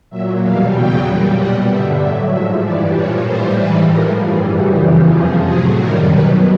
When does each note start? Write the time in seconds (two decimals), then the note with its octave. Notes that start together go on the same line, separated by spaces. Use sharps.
0.10 A#2 F#3 E5
0.42 E2 B2 G3 F5
0.73 E2 C#3 F#3 G5
1.05 A#2 G3
1.37 B2 G3 F#5
1.68 G2 D3 G3 E5
2.00 A2 F#3 E5
2.31 G#2 F3 E5
2.63 G2 E3 G3 D5
2.94 A#2 F3 C#5
3.25 A2 E3 G3 C5
3.57 G#2 E3 G3 B4
3.88 A2 F3 A#4
4.20 G2 E3 G3 G#4
4.52 F#2 C#3 E3 G3 F#4
4.83 E2 C#3 F3 G4
5.15 F2 C3 F3 G#4
5.46 A2 F#3 G#4
5.77 F#2 D#3 G3 A#4
6.09 B2 F#3 B4